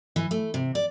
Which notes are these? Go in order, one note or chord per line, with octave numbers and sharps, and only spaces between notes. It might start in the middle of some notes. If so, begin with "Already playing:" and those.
E3
A3
C3
D5